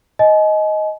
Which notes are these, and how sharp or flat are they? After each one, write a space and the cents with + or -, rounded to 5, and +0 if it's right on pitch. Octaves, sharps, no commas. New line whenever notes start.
D#5 +5 G#5 +40